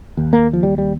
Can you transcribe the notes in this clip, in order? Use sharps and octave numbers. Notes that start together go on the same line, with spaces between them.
D#2
A#3
F3
G3
G3